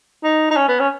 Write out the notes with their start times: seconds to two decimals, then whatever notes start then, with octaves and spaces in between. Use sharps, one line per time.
0.23 D#4
0.51 D#4
0.56 C#4
0.68 B3
0.80 C#4